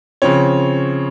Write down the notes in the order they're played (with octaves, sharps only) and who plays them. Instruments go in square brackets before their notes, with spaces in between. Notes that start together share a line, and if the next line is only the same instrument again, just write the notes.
[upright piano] C#3 F3 C4 C#5